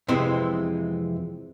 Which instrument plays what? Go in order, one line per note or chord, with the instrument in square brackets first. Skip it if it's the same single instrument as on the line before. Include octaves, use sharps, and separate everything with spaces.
[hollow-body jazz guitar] F2 C3 E3 G#3 C4